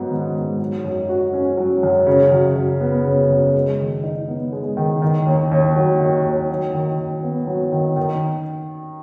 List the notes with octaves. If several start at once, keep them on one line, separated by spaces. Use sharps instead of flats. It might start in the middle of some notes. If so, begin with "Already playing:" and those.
Already playing: G#2 F#3 B3
D#3
G#2
F#3
F#2
F#4
C#4
F#3
F#2
C#3
F#2
F#2
B3
C#3
F#2
G#3
D#3
D#4
B3
G#3
D#3
D#3
D#2
D#2
F#3
D#3
D#2
F#3
D#3
D#3
B3
F#3
D#3
D#3